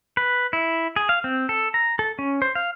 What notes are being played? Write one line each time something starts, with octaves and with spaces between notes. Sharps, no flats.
B4
E4
G#4
F5
C4
A4
A#5
A4
C#4
C5
F5